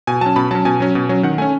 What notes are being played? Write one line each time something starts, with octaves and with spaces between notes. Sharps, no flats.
B2 G#5
F#3 C#4 A5
B2 B5
F#3 C#4 A5
B2 G#5
F#3 C#4
B2
F#3 C#4
D#3 F#5
A3 C#4 G#5